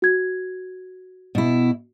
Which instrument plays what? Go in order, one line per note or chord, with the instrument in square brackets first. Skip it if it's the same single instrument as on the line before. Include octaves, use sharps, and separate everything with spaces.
[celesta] F#4 G#6
[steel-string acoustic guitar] B2 E4